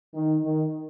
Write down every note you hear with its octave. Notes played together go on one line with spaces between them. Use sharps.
D#3
D#3